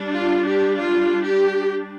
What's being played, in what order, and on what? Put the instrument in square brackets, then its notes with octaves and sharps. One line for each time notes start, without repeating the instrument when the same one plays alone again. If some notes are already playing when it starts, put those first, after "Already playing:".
Already playing: [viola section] G3 D4
F4
G4
F4
G4